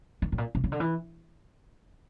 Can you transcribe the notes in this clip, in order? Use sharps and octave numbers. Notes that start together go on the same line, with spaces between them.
D#3
A2
A#2
C3
C#3
D3
E3